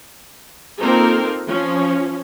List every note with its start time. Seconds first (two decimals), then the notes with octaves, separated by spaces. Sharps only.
0.80 A#3 C4 D#4 F4 A4 A#4
1.47 F3 C#4